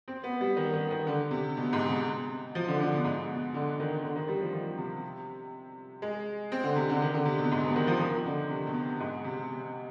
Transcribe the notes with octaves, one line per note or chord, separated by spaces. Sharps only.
C4
B3
G3
D#3
D#3
D#3
D3
C3
B2
G#2
C3
F3
D3
D3
B2
G#2
B2
D3
D#3
D3
D#3
G3
F3
D#3
C3
G#3
C4
D3
C3
D3
D#3
D3
C3
B2
G#2
B2
D#3
F3
D#3
D3
C3
B2
G#2
C3
C3